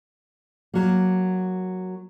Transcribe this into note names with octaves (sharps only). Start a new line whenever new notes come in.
F#3 A#3